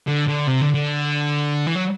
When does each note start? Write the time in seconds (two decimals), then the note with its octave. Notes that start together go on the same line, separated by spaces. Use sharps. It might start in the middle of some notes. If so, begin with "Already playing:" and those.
0.08 D3
0.28 D3
0.48 C3
0.61 D3
0.74 D3
1.67 E3
1.75 F#3